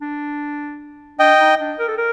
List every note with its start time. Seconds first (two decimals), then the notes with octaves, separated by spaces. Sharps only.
0.01 D4
1.19 D4 D#5 G5
1.39 D#4
1.59 D4
1.78 A#4
1.88 A4
1.97 A#4